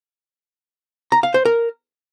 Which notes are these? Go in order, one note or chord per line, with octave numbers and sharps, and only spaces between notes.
A#5
F5
C5
A#4